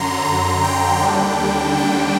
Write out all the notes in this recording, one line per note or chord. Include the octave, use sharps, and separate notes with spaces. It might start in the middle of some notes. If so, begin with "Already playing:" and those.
Already playing: F#2 D3 F#3 A#5 C6
A#5
G5
D#2 D3 G3 D4
G5